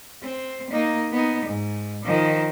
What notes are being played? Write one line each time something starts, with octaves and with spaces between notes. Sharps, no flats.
C4
A#3 D#4
B3 D#4
G#2
D#3 F3